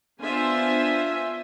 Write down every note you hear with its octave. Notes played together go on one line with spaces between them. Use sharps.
B3 D4 F4 C5 E5 G#5